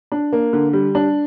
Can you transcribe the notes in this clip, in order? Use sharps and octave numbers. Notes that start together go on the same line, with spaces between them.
D4
A#3
D3
G3
D4